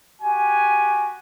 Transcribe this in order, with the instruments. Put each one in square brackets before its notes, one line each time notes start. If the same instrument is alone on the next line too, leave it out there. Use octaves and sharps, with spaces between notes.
[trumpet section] F#4 G4 G#5